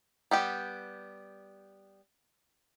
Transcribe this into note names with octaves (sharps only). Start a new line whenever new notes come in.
G3 B3 G4